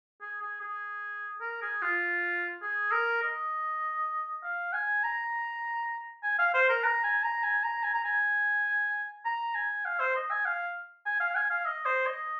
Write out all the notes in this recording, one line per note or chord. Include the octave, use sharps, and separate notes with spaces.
G#4
G#4
G#4
A#4
G#4
F4
G#4
A#4
D#5
F5
G#5
A#5
G#5
F5
C5
A#4
A#5
G#5
A#5
G#5
A#5
G#5
A#5
G#5
A#5
G#5
F5
C5
D#5
G#5
F5
G#5
F5
G#5
F5
D#5
C5
D#5